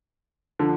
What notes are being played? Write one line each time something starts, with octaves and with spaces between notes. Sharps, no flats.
D3 F3